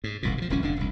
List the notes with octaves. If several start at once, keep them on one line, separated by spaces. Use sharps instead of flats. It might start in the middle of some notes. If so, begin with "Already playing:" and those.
G#2
D#1 C2 A#2
A#2 F3
D1 C2 F3 C#4
F1 D3 D4
E1 C2